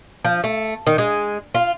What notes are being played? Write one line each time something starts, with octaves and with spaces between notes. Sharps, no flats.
F3
A3
D#3
G#3
F4